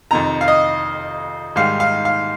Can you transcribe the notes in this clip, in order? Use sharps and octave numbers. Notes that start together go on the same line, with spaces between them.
F2 C3 D#3 A#5
F5
D#5
G#2 D#3 G3 F5
F5
F5